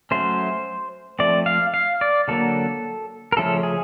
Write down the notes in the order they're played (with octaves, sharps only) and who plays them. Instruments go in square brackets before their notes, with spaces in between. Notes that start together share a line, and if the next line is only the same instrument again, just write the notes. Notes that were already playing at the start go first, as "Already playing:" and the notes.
[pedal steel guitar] F#3 A3 C#4 C5
F3 A3 C4 D5
F5
F5
D5
D3 F#3 A#3 A4
A#4
C#3 F3 A3 C#4 A4
G#4